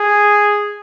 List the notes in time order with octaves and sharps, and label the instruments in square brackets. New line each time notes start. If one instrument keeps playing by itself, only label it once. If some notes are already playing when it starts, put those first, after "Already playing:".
Already playing: [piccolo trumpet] G#4